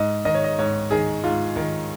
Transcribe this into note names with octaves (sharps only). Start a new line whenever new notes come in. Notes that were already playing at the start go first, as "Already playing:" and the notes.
Already playing: G#2 D#5
D#3 D#5
C#5
D#5
G#2 C#5
D#3 G#4
G#2 F4
D#3